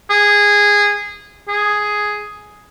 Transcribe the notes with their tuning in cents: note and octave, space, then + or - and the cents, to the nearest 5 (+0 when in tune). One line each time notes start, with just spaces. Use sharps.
G#4 -15
G#4 +5